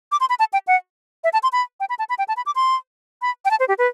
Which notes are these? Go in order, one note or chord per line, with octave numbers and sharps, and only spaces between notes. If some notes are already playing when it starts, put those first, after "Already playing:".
D6
C6
B5
A5
G5
F#5
E5
A5
C6
B5
G5
B5
A5
B5
G5
A5
B5
D6
C6
B5
G5
A5
C5
G4
B4